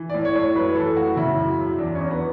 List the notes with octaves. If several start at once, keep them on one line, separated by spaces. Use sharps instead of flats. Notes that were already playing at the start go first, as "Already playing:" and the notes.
Already playing: E3
A2 D5
C#5
A2 C#5
F#2 B4
E3 A4
F#2 F#4
C#3 E4
F#2
F#2
E2 D4
C#4
E2
B3